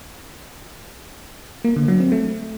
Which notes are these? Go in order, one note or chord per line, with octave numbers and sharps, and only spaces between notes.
A#3
D3
F#3
C4
A3